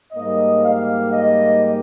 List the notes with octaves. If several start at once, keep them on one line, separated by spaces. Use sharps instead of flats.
G#2 G3 A#3 D#5
F5
D#5